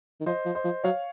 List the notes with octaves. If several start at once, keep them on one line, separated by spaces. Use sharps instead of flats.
D#3
F3 C5 D#5
F3
C5 D#5
F3
F#3 C#5 F5